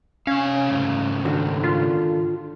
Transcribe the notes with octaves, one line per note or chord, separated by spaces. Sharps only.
C3 C#4 F5
G#2 C#3 A3
D3 D#3 F#4
F4